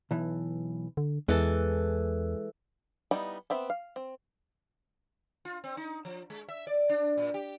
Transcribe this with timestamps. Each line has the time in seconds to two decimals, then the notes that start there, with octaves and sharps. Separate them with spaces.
0.11 B1 E3
0.97 D3
1.28 E2 E3 G#3 A4
3.11 G3 B3 D#4 E4 G5
3.50 B3 C4 E5
3.70 F5
3.96 C4
5.45 F4
5.64 C4
5.77 D#4
6.05 F3
6.30 G#3
6.48 E5
6.67 D5
6.89 D4
7.17 A#2
7.34 G4